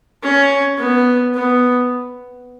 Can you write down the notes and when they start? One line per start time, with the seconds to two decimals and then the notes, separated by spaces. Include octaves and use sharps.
0.23 C#4
0.78 B3
1.34 B3